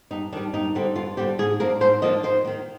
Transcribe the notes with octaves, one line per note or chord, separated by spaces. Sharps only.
G2 D#4
D#3 G3 D4
G2 D#4
D3 G3 C4
G2 F4
D3 G3 C4 G4
G#2 G#4
F3 A#3 D4 A#4
G#2 C5
F3 A#3 D4 D#5
D#2 C5
D#3 A#3